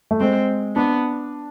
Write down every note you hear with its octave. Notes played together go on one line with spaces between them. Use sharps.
A3
G#3 C4
B3 D4